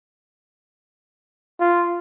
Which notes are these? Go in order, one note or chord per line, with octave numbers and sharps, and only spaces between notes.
F4